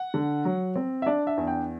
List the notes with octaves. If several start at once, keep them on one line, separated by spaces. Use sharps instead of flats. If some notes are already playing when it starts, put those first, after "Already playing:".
Already playing: F#5
D3
F#3
C4
E5
D4 D5
E5
E2
G5